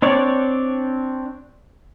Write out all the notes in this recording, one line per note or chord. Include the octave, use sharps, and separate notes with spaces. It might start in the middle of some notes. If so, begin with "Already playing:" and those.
C4 D4 C#5 D5